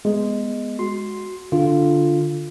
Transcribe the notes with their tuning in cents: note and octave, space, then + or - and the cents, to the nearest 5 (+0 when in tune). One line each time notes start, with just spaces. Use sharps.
G#3 +0 B3 +0
F#4 +0 C6 +0
D3 +0 F4 -5